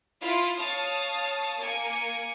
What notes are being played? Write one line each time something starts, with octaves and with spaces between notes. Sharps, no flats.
E4 F4 F5
C#5 F5 A5 D#6
A#3 G#5 C#7